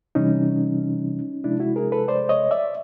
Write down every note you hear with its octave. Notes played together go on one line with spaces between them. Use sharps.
C3 E3 G3 C#4 D#4
C3 F3 G#3 D4 E4
E4 F#4
G#4 A#4
A4 B4
C5 D5
C#5 D#5
D5 E5